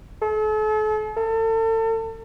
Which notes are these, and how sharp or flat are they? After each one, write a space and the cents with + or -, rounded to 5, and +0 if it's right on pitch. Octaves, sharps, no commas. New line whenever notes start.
A4 -40
A4 +35